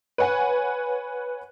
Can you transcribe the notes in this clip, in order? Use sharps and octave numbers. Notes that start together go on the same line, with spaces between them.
B4 C#5 F#5 G#5